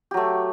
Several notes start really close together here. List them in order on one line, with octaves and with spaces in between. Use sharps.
G4 F#3 A3